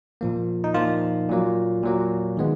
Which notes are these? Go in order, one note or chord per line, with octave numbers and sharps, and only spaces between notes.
A#2 F3 A#3
D#4
A#2 F3 A#3 F4
A#2 F#3 A#3
A#2 F#3 A#3
D#3 G#3 B3